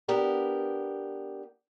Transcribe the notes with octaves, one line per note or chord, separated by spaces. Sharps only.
B3 D4 G4 A#4